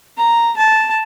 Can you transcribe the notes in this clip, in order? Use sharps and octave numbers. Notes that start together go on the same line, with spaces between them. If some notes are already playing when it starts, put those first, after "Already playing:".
A#5
A5